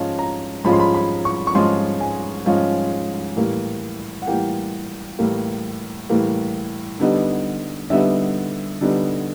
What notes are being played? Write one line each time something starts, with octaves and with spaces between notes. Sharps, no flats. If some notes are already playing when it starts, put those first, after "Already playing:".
Already playing: G#2 F3 G#3 C#4 F4 A5
A#5
G#2 F3 G#3 C#4 F4 B5
C6
B5
B5
C#6
C#6
G#2 F3 G#3 C#4 F4 C6
G#5
G#2 F3 G#3 C#4 F4
A2 E3 G3 A#3
F#5
A2 E3 G3 A#3 G5
A2 E3 G3 A#3
A2 E3 G3 A#3
D3 G3 B3 D#4
D3 G3 B3 D#4 E5
D3 G3 B3 D#4